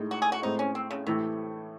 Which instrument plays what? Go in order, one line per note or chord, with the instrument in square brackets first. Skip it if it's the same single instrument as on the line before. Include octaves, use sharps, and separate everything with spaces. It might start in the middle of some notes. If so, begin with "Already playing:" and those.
Already playing: [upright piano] A2 G#3 D#4
[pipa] F#4
G#4
F#4
[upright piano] A2 G#3 C4 [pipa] D#4
[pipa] C#4
C4
C#3
[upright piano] A2 E3 A3 [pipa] C3